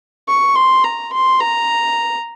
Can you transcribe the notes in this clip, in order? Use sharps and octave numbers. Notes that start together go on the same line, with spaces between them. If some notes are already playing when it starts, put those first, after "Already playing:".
C#6
C6
A#5
C6
A#5